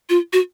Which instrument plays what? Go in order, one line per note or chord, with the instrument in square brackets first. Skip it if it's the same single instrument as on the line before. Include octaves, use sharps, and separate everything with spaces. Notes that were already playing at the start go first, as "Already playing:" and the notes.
[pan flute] F4
F#4